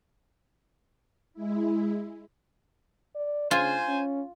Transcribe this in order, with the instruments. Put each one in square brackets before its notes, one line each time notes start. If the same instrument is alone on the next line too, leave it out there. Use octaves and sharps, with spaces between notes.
[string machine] G#3 E4
[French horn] D5
[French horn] C#3 [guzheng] F4 [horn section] C5 G#5
[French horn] C#4